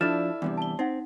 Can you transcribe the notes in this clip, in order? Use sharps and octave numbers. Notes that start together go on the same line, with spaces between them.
F3 D4 E4 A4 D5 F6 A6 E7
E2 G2 C3
A5 G7
C4 D#4 F#5